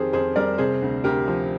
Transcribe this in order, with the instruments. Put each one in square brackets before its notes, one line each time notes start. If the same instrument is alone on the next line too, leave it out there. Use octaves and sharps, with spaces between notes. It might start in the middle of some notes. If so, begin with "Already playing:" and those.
Already playing: [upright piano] F2 D#3 G4 G#4 A#4 C5
F2 G#4 C5
G3 A#4 D5
C3 G#4 C5
D2
D2 G4 A#4
F3